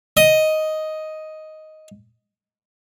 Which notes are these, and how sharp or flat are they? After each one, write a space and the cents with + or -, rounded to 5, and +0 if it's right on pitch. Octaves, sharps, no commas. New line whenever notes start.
D#5 +5